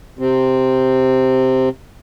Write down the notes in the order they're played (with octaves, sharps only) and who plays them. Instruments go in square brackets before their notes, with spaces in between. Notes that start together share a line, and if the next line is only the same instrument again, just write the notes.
[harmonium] C3 C4